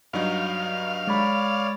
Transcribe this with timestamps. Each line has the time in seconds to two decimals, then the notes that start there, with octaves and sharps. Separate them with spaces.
0.13 G2 F#3 D#4 F5
1.07 G#3 C#5 D5 B5